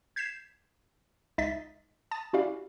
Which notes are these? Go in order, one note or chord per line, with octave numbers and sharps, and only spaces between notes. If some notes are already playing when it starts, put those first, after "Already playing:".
G6 G#6 B6 C7 E7
C#2 D#4 D#5 E5 A6 B6
A5 D#6 A6
C#4 E4 F#4 G4 D5 F5